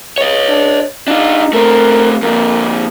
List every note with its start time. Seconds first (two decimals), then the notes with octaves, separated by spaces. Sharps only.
0.18 C#5 D#5
0.49 D4
1.08 D4 D#4 F4
1.53 A3 C4 A#4
2.22 F2 A#2 A#3